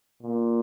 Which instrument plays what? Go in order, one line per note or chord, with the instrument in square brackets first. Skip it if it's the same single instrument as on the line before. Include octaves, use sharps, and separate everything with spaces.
[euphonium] A#2